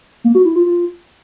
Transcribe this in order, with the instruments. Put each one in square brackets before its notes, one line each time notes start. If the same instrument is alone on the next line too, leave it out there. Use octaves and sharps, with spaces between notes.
[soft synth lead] A#3
F#4
E4
F4
F4